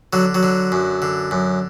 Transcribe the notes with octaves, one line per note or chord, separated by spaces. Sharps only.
D3 F#3
F#3
D3
F#2
D3
F#2